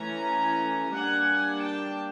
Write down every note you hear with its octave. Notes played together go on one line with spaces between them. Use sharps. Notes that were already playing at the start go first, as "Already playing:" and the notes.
Already playing: E3 A3 C#4 G#5 A#5
G3 A#3 D4 F#5 G#5
G5 A5